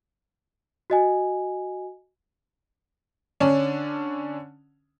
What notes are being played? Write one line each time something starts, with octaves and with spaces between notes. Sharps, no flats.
F#4 D#5 G#5
D3 C#4 D4